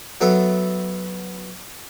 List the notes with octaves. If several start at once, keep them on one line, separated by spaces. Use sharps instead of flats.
F#3 B3 A4 E5